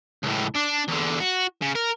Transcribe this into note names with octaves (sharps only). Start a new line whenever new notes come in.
C#2 A2
D4
E2 D3
F#4
C#3
A#4